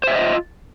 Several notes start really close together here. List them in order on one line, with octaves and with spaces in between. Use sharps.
C5 E5 C#5 D#5 F4